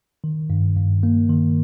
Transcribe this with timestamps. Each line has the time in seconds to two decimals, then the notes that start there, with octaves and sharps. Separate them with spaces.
0.24 D#3
0.50 G2
0.77 G2
1.03 A#3
1.29 D#3